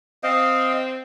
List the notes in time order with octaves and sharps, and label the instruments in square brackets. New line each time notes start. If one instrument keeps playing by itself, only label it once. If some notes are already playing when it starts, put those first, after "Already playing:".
[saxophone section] C4 [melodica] D#5 F5